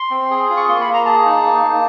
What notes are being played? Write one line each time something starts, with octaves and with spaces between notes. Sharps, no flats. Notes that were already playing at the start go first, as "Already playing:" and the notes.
Already playing: C6
C4
G#4
F4
C#6
A#3 C6
B5
A#3
A#5
G#4 A5
D#4
A#3
A#3